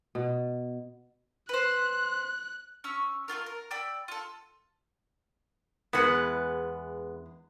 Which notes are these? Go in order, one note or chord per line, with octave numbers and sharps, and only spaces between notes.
B2
B4 C5 F#6
C#4 C#6 E6
A3 A#3 F4 A#4
A#4
D5 G5 B5 E6
F4 A4
E2 G#3 B3 B4 F#5